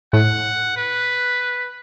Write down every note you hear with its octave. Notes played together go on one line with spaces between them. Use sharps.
A2 F#5
B4